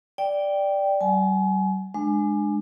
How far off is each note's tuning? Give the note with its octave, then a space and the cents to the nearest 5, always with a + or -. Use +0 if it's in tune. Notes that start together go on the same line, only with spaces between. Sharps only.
D5 +0 G5 +0
G3 -45 G#5 +30
G#3 +5 D4 +30